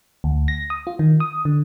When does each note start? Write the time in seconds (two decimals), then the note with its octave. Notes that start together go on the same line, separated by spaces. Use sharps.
0.24 D2
0.48 A#6
0.70 D#6
0.87 F4
0.99 D#3
1.20 D#6
1.45 D3